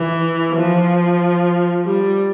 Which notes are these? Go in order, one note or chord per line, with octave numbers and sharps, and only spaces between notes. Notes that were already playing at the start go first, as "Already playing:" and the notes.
Already playing: E3
F3
G3